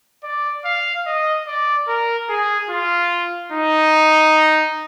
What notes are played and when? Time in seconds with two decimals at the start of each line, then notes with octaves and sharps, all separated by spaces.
0.24 D5
0.65 F5
1.06 D#5
1.47 D5
1.88 A#4
2.29 G#4
2.70 F4
3.52 D#4